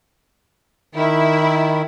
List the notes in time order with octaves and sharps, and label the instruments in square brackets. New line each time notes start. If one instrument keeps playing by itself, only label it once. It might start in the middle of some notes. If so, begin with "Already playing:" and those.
[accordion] D#3 [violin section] E4